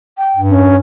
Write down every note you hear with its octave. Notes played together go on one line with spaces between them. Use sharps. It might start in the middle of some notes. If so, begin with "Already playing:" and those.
G5
G2
C#4